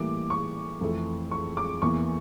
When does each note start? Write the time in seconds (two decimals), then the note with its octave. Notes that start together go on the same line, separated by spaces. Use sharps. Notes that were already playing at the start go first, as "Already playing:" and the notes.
Already playing: A2 E3 G3 A#3 D6
0.30 C#6
0.81 F2 E3 A3
1.31 C#6
1.57 D6
1.82 E2 E3 A#3 C#6